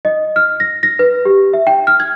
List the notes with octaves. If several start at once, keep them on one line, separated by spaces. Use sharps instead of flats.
D#5
F6
A#6
A#6
B4
G4
E5
G5
F6
G#6